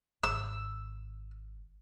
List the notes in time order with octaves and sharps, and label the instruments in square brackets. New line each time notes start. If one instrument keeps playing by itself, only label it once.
[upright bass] G#1 [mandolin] E6